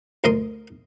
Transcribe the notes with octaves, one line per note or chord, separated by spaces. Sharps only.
D2 A#4 D#5 C6